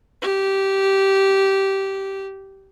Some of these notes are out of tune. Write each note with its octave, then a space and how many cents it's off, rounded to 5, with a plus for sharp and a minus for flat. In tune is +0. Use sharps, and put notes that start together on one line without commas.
G4 -15